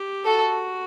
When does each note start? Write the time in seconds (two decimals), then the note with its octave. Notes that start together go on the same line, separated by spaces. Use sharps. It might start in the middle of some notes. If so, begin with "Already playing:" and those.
Already playing: G4
0.25 F#4 A4